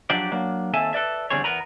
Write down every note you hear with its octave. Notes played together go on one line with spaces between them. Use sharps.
F3 F#3 D4 G4 C5 D5
F#3 A#3 D4
D#2 C4 A4 E5 G#5 A5
A4 B4 D5 E5
E2 D3 G3 C4 G#4 C#5
E2 B3 A#4 B4 A#5